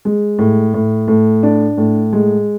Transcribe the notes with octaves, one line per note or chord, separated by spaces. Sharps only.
G#3
A2
A2
A2
D4
A2
G#3